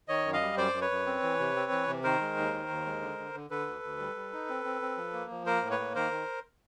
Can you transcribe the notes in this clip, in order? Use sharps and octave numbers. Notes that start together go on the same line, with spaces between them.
D#3 C#5 D#5
F#2
D#5 F5
G3
F#2 C5 D5
F#2
B4 C#5
F#2
C4
E3
C3
C4
E3
C3
D#3 A#4 C5
G#3
D#2
D#3
D#2
G#3
D3
D3
D3
D3 A4 B4
D2
D2
G3
G3
D#4
C4
C4
C4
F3
A#3
F3
A#3 A#4 C5
A2
B4 C#5
A#3
D#3 A#4 C5
D#3